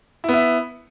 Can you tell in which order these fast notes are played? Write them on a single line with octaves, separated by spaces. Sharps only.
E4 B3 E5